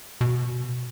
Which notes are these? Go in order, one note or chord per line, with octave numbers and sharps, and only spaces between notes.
B2